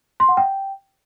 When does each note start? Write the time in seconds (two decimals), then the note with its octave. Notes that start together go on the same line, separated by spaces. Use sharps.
0.20 C6
0.29 F#5
0.37 G5